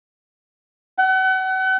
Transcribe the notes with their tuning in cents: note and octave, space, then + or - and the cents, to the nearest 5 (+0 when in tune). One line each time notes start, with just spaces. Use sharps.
F#5 +35